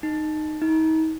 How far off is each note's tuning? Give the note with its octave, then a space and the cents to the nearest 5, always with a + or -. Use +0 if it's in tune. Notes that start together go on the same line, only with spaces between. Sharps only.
D#4 -15
D#4 +40